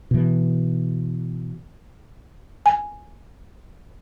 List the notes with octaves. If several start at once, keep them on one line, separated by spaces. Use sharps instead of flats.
B2 E3
G#5